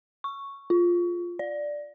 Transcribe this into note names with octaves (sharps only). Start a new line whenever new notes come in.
C#6
F4
D5